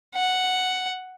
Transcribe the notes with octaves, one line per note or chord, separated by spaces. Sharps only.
F#5